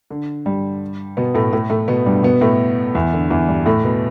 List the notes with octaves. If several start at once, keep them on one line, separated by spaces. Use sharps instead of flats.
D3
G2 G3
B2 B3
A2 A3
A2 A3
A2 A3
B2 B3
G2 G3
B2 B3
A2 A3
E2 E3
D3
E2 E3
G2 G3
A2 A3
B2 B3